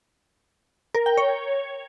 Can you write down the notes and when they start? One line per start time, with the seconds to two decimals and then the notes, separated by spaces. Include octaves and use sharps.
0.95 A#4
1.06 G5
1.17 C#5